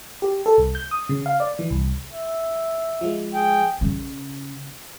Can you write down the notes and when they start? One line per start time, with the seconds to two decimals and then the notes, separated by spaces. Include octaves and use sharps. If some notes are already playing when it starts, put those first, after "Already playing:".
0.22 G4
0.46 A4
0.58 C2
0.75 G6
0.91 D#6
1.09 C#3
1.26 F5
1.40 D5
1.59 E3
1.70 C2
2.12 E5
3.01 F3 G#3
3.34 G#4 G5
3.81 C#3